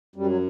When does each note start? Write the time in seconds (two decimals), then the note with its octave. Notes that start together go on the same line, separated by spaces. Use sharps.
0.16 F#2 G3
0.27 F#3